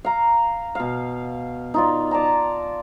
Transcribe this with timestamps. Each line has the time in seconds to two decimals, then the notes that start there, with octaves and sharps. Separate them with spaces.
0.05 F5 A#5
0.75 B2 F5
1.74 D#4 F4 D5
2.11 D5 A5 A#5